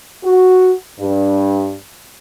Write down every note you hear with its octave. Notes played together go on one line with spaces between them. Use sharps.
F#4
G2